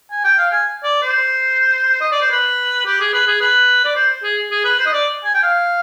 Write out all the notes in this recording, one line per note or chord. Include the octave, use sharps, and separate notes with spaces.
G#5
G5
F5
G#5
D5
C5
D#5
D5
C5
B4
G4
G#4
B4
G#4
B4
D5
C5
G#4
G#4
B4
C5
D#5
D5
G#5
G5
F5